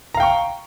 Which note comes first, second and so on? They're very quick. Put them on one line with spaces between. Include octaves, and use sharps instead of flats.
A#5 F5 G5 C#6